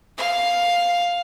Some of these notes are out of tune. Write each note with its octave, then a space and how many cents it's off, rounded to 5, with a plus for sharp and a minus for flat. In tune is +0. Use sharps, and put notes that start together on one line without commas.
F5 +5